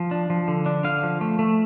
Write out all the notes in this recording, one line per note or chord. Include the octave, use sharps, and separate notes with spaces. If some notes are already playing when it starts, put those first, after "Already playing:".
Already playing: F3
D4
F3
D3
D4
D3 F5
F3
A3
A3